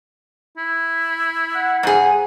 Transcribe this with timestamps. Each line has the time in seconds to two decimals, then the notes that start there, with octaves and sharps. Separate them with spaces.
0.58 E4
1.54 F#5
1.83 G#2 G#4